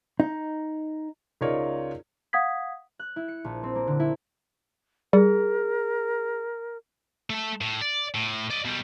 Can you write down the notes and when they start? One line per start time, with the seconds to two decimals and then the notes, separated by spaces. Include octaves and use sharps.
0.20 D#4
1.41 C#2 D#4 F4 A#4 C#5 D5
2.33 F5 F#5 D#6 G#6 B6
2.99 F#6
3.16 E4
3.28 C#7
3.44 A#1
3.63 C4
3.75 A#3
3.87 D3
4.00 E4
5.13 G3 G#4 A#4
7.30 A3 A4
7.61 A2
7.82 D5
8.14 A2
8.51 D5 D#5
8.65 B2 G3